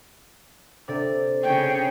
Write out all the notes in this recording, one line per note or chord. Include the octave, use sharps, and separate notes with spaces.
C3 D4 A4 D5
C#3 C#5 G5